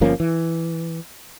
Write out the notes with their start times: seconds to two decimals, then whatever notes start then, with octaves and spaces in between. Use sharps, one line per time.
0.01 G1 F3 A#3 C#4
0.20 E3